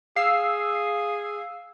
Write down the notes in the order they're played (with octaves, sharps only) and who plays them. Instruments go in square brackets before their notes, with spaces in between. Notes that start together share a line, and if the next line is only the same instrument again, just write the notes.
[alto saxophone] G#4 [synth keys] F5 E6 C7